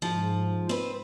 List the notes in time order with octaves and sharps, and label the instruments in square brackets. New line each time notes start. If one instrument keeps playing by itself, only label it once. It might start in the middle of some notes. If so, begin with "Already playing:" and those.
[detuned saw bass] G#2 [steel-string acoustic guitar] F3
[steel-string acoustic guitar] C4 B4